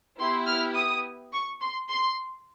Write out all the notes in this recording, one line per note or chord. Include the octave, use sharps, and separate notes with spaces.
B3 E4 G4 C6
F6
D#6
C#6
C6
C6